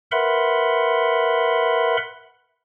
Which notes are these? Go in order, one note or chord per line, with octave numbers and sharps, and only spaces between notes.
A#4 B4 E5 F#5 B5 C6